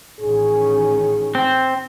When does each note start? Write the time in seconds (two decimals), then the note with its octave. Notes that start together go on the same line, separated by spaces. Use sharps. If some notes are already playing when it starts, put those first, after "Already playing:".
0.20 A1 D#3 C#4 G#4
1.35 C4